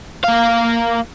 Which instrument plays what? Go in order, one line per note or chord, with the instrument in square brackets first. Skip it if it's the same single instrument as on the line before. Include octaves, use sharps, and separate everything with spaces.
[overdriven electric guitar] A#3 F5